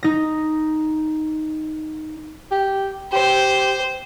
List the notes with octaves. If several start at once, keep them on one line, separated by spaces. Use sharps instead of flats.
D#4 A#6
G4
G4 C5